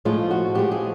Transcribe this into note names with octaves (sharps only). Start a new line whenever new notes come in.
A2 F3 G#3 F4
F#4
A2 F3 G#3 G4
G#4